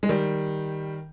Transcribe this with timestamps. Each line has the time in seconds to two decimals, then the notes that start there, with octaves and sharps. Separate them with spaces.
0.03 G#3
0.09 D#3 G3